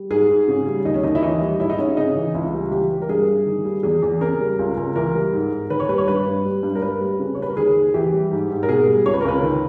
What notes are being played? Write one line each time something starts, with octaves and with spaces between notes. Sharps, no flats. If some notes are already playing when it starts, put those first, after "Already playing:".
Already playing: G3
G#2 G#4
G#2
C#3
G3
D#2 D#4
C#4
D#2 D#4
E4
E3 D#4
G3
G#2 E4
D#4
G#2 C#4
C#3 D#4
E3
C#2 E4
G3
E3 G4
G3
A#4
G2 G#4
G2
D#3
G3
E2 G#4
E2
C#3 A#4
G3
C#2
C#2
E3 A#4
G3
G#2
G#2
D#3 B4
C#5
G3 B4
C#5
G2 B4
G2
G3
G2
A#4
G2 B4
G3
C#3
C#5
G3 B4
A#4
D#2 G#4
D#2
E3 G4
G3
G#2
G#2
A#4
B2 G#4
G3
C#2 C#5
B4
A#4
C#2 B4
D#3